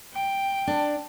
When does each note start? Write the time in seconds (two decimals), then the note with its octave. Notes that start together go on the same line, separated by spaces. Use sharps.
0.14 G5
0.67 D4